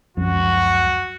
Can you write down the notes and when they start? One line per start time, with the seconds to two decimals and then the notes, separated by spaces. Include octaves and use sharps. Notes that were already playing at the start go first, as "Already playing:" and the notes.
0.17 C#2 F#2 F3 F#4